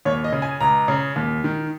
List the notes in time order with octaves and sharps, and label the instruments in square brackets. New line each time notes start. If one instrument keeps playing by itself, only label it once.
[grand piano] D#2 C#5
D#5
C#3
G#5
C#2 A#5
C#3
D#2
D#3